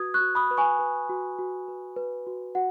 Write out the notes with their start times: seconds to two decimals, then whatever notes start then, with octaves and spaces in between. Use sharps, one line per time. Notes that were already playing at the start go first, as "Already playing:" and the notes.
Already playing: F#4 B4 D#6 G#6
0.14 C#6 F#6
0.21 F#4
0.35 B5 D#6
0.51 B4
0.57 G#5 C#6
0.79 B4
1.09 F#4
1.39 F#4
1.68 B4
1.96 B4
2.27 F#4
2.55 F#4 F#5